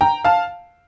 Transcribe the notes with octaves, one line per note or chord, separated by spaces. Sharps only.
G5 A#5
F5 A5